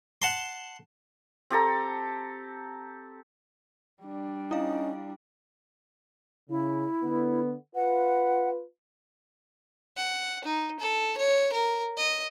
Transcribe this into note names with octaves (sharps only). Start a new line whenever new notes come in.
F#5 A5 C6
C4 G4 A4 A#5
G3 D4
C#4 D#4 E4 F5
C#3 E4
D3 B3
F4 B4 F#5
F#5
D#4
A4
C#5
A#4
D#5